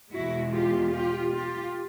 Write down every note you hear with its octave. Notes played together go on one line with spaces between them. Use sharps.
E2 B2 G#3 E4 F#4
F4 G4
F4 G4
F4 G4